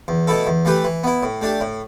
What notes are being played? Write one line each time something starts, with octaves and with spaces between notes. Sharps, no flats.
E2
B2 A3 E4 A4
E2
E3 A3 G4 B4
E3
B3 E4
A2
A3 D4 G4
A2